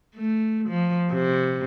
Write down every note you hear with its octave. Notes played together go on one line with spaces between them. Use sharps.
A3
F3
C3